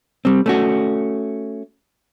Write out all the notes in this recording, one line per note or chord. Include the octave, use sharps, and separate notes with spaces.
G3 C4
A3 C#4 F#4